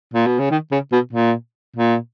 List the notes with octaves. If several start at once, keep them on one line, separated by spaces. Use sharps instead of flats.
A#2
B2
C#3
D#3
C#3
B2
A#2
A#2